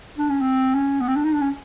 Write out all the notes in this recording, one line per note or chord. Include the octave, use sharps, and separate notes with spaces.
D4
C#4
C4
C#4
B3
C4
D4
D#4
D4
C#4